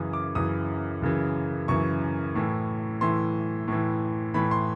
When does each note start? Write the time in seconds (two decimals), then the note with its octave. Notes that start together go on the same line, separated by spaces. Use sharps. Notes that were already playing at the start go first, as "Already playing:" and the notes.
Already playing: F#2 C#3 E3 D#6
0.13 D6
0.35 F#2 C#3 E3 D#6
1.02 F#2 C#3 E3
1.68 F#2 C#3 E3 C#6
2.35 A2 E3
3.01 A2 E3 C6
3.68 A2 E3
4.34 A2 E3 B5
4.51 C6